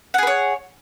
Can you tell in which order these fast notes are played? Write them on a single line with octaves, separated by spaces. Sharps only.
F#5 G#4 B4 C#5